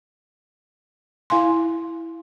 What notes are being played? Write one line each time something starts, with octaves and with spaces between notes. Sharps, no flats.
E4 F5 G#5 C6